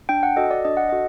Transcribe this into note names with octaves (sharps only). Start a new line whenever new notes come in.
D4 G5
F#5
F#4 A4 D#5
D5
D4 D#5
F#5
F#4 A4 D#5